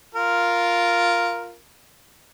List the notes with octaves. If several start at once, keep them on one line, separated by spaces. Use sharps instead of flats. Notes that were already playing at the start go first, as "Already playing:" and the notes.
F4 A#4